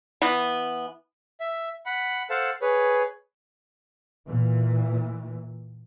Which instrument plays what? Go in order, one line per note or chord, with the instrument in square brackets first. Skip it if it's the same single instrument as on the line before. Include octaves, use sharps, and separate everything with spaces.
[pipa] E3 B3
[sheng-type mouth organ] E5
F#5 B5
A4 C5 F5 F#5 A5
G#4 B4 C#5
[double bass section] A#2 E3